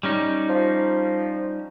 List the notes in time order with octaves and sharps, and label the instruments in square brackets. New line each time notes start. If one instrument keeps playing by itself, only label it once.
[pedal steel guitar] G3 C#4 D#4
[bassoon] F3